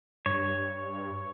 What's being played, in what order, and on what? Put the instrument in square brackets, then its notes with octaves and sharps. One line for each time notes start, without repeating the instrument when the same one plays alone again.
[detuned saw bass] G2 [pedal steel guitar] C#5